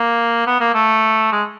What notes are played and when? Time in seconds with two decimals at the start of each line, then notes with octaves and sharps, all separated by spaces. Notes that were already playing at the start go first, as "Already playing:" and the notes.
Already playing: A#3
0.47 B3
0.60 A#3
0.74 A3
1.32 G#3